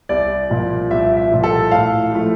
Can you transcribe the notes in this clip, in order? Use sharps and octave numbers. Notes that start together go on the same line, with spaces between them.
C2 D5
A#2 F3
C2 E5
E5
A#2 F3
A4
A2 F5
F3 A3